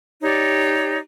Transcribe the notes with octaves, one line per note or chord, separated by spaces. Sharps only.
D#4 G4 C#5 D5